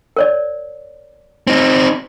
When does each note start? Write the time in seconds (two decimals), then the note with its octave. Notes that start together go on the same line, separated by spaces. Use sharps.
0.17 A#4 C#5 D5
1.47 C4 D#4